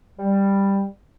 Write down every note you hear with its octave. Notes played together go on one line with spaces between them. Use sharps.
G3